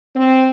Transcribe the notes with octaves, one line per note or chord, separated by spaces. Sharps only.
C4